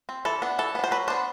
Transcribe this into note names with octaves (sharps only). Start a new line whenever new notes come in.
C4
E3 A4
B3 D4
E3 A4
B3 D4
C5
F#3 B4
B3 D4 C5